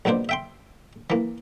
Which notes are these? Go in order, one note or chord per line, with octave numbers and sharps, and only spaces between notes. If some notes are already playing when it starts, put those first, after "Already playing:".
A#1 B2 A#3 D4 C5
E5 G5 C6
E3 A#3